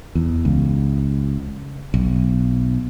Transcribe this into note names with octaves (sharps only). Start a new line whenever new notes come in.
E2
C#2
B1